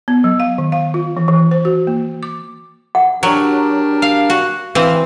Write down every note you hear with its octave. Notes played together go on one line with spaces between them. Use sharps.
B3
F#3
F5
D#3
F5
F4
E3
E3
C5
F#4
A#3
D6
F#5
F#3 D4 G4 A#4
F5
F#4
E3 C4 F5